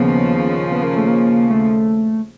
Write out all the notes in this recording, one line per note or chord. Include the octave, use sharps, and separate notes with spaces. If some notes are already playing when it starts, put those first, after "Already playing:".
Already playing: D#2 C#3 F3 B3
B3
A#3
A3
A#3
A3